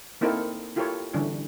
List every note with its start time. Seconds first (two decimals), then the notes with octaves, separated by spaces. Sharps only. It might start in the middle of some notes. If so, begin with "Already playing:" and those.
0.21 A#3 C4 D#4 E4 A4 A#4
0.76 E4 F4 G4 A4 A#4 C#5
1.14 D3 E3 G3 C#4 D4